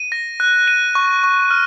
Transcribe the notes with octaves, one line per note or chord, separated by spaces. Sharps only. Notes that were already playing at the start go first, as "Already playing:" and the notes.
Already playing: D#7
A#6
F#6
D#7
C#6
C#6
F6